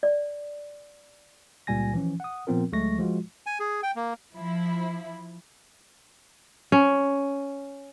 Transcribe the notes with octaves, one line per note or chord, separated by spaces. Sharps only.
D5
C#2 A#2 G3 G#5 A#6
E3 F3 C#4
F#5 D#6
A#2 F3 B3 C4 F4 A#4
D2 F#3 G#3 A3 C#6 A#6
F3 G#3 F4 F#4
G#5
G#4
G5
A#3
F3 E4
C#4